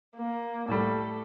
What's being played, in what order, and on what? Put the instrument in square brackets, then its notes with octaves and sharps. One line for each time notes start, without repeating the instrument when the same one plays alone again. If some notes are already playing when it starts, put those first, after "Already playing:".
[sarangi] A#3
[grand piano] A2 G3 [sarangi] A4